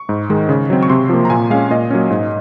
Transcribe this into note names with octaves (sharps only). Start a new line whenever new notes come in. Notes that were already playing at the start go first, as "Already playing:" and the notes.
Already playing: C#6
G#2
D#3 G#3
C#3
F#3 C4
C#6
C3 C6
F3 A#3
A#5
A#2 G#5
G#3 C#4 F5
A#2 D#5
F#3 A#3 C#4
G#2